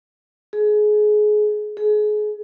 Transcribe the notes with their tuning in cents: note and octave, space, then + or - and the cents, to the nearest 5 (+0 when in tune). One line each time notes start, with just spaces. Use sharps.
G#4 +25
G#4 +30